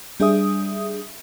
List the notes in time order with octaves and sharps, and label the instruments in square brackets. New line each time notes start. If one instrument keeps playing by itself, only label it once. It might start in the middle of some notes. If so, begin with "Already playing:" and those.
[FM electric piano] G3 D4 G#4 E5 D#6